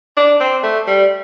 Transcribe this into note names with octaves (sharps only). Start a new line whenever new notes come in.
D4
C4
A3
G3